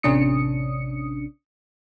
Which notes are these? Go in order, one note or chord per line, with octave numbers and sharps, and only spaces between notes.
A1 C3 C#4 D4 D#6 C#7